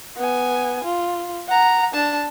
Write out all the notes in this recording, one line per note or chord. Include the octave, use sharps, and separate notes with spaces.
B3 G#5
F4
F#5 A#5
D4 A5